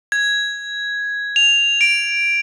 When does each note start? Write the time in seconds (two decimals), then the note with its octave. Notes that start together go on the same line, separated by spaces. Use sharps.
0.12 G#6
1.36 F7
1.81 D7